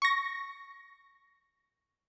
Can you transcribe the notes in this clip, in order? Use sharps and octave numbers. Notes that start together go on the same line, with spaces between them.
C#6 A#6